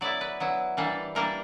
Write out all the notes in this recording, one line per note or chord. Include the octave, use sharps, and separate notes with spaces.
F#3 B3 E4 D5
B4
F#3 B3 E4
E3 G3 A#3 D4
E3 G3 A#3 D4 A#4